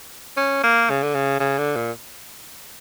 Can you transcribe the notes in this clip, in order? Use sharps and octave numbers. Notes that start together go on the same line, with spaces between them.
C#4
A#3
C#3
D3
C#3
C#3
D3
A#2